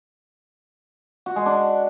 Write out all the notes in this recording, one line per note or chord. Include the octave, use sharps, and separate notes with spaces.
F#4
G#3
D4